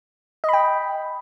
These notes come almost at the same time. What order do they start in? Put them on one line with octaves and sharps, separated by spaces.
D#5 B5 G5